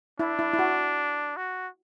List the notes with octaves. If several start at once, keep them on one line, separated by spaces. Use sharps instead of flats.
D4 E4
E4
E4
F#4
F#4